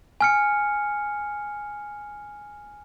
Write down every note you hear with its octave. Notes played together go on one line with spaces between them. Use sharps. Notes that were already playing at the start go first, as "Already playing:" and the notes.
G#5 F6 C#7